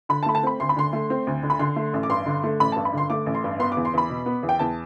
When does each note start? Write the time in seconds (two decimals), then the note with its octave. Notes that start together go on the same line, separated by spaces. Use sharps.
0.09 D3 B5
0.23 A5
0.26 A3 B5
0.35 A5
0.43 C4 B5
0.60 D2 C6
0.69 B5
0.76 D3 C6
0.93 A3
1.10 C4
1.27 D2
1.43 D3
1.50 B5
1.59 D3 C6
1.76 A3
1.93 A1
2.03 D6
2.09 G2 C6
2.26 D3
2.44 A3
2.60 A1 B5
2.72 A5
2.76 G2
2.85 B5
2.93 D3 C6
3.10 A3 D6
3.26 A1
3.35 C6
3.44 G2
3.59 B3 C6
3.72 D6
3.77 E2
3.85 C6
3.94 E2 B5
4.10 B2
4.26 B3
4.43 E2
4.49 G5
4.59 E2 A5